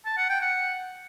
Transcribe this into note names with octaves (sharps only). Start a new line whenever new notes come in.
A5
F#5
G5
F#5